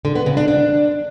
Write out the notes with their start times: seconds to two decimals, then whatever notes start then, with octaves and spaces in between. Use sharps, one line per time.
0.05 D3
0.15 B3
0.26 C#3
0.37 D4
0.48 D4